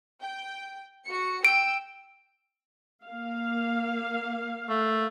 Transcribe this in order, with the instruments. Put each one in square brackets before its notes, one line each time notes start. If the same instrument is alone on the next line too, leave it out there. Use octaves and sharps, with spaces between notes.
[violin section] G5
F#4 C#7
[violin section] G5 E6 [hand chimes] D7
[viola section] A#3 F5
[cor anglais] A3